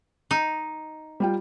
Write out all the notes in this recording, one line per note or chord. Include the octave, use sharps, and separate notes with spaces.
D#4
G3 F4 G5